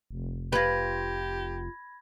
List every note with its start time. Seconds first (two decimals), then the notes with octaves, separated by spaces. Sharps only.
0.11 F1
0.53 F4 G4 B4 B5 G#6 A#6